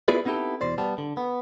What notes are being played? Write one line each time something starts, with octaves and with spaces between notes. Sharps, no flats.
B3 E4 F4 G#4 B4 D5
B3 C4 D#4 E4 G4 A4
E2 B2 C5 D5
G3 B3 A5
D3
B3